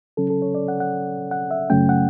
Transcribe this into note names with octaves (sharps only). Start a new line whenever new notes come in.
C#3 F#3 C#4 A4
A4
C#5
D5
F#5
F#5
F#5
E5
F#2 C#3 F#3 A3 C#4 G5
F#5